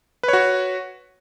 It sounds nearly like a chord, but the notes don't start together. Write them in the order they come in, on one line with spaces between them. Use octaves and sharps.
B4 C#5 F#4